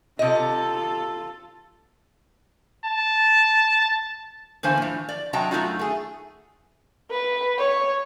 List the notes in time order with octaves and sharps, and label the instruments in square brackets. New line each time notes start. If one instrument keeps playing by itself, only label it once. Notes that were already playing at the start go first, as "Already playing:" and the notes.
[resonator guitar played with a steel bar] C3 D#5 [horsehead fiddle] F4 A4
[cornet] A5
[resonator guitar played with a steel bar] E2 D3 A#3 C5 G#5
A2 F3
D5
C3 F#3 D#5 G5 A5 A#5
F#2 A#2 A3 D#4 F4 F#4
A3 G#4
[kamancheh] B4
C#5